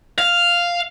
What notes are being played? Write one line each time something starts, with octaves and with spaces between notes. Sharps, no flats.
F5